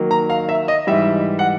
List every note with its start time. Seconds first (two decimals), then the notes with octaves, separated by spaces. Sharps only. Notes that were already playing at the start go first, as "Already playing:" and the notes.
Already playing: D#3 F#3 A#3 D#4
0.11 A#5
0.30 F5
0.49 E5
0.68 D#5
0.87 G#2 E3 G3 E5
1.39 F#5